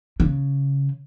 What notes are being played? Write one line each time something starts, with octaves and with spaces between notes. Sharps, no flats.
C#3